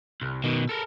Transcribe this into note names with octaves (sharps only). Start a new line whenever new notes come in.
C2
B2 D#3
A4 A#4